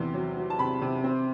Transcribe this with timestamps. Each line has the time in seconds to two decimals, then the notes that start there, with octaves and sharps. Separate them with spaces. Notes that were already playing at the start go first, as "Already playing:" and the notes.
Already playing: E2 C3
0.14 F#3
0.37 F#3
0.50 A5
0.59 C3 B5
0.82 C3
1.04 C4